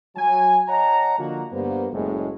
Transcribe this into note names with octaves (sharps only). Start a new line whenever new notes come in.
F#3 G#5
C#5 D#5 F#5 A5 A#5
D3 F3 A#3 D4 F#4
G2 A#3 B3 C5
F#1 A2 G#3